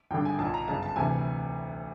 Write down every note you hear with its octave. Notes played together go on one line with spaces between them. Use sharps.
G#1 G2 D3 G5
G#5
B1 A5
A#2
A#5
G1 F#2 C#3 A5
A5
D2 C3 E3 G#5